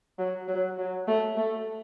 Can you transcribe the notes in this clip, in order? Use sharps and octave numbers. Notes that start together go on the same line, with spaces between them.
F#3
F#3
F#3
A3
A3